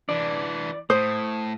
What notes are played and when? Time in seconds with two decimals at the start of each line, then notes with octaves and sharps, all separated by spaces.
0.09 E3 D4 D5
0.90 A2 C5 D#6